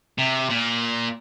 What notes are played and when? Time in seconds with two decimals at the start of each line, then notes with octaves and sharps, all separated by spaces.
0.18 C3
0.50 A#2